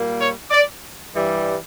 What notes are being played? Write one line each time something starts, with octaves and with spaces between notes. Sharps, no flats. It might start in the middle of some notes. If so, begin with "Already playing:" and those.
Already playing: A#2 G3 A#3
C#5
D5
G2 E3 G3